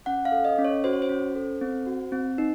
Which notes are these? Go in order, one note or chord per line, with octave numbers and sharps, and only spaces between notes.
C#4 F#5
F5
A4
D#5
C#4
C#5
F#4 C5
C#5
C5
C#4
A4
C4
F#4
C4
D#4